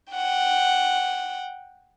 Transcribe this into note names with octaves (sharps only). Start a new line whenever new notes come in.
F#5 G5